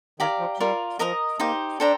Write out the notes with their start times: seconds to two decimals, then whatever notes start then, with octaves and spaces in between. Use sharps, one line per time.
0.20 D#3 G4 D5 F5 A#5
0.39 F3
0.60 G3 F4 A#4 D5
0.99 F3 A#4 D#5 A#5 D#6
1.40 A#3 D#4 G4 C5
1.80 D4 A4 C5 G5 A#5